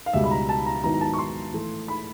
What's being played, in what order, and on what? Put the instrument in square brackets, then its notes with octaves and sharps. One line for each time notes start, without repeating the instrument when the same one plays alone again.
[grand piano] F5
C#2 B2 G3 E5
B5
A#5
A5
A#5
G#2 D#3 F#3 B3 E4 A#5
A#5
A5
C#6
C6
A2 E3 A3
B5